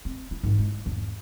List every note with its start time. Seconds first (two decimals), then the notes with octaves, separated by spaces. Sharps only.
0.05 C4
0.31 E4
0.43 G#2 D#3
0.58 G#3 E4
0.86 G#1 E2